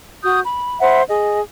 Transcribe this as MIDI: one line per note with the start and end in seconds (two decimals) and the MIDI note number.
0.22 0.40 66
0.22 0.40 87
0.22 0.40 91
0.45 0.80 83
0.80 1.02 72
0.80 1.02 76
0.80 1.02 78
0.80 1.02 83
1.09 1.41 68
1.09 1.41 75